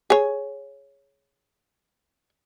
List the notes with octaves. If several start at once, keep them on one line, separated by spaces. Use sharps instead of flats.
G#4 C#5